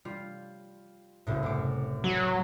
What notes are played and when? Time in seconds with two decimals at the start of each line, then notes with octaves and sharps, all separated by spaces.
0.05 G3 F4
1.27 F#1 C2 A2
1.43 F#2 D6
2.04 F#3